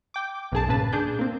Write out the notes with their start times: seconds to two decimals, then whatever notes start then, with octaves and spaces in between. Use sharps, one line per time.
0.14 G5 D6
0.52 B1 F#2 G#4 A5
0.69 G2 A#2 C#3 B4 A5
0.92 D4 G#4 G6
1.19 A#3 C4